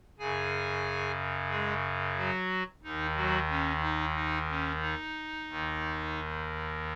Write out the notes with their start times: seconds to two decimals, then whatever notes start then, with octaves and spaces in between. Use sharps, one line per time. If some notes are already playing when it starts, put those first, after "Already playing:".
0.19 F#2 C#3 G#4 G#5
1.50 G#3 G#4
2.17 F#3 F#4
2.83 D#2 D#3 D#4
3.16 F#3 F#4
3.49 C#4
3.82 D#4
4.16 D#4
4.49 C#4
4.81 D#4
5.48 D#2 D#3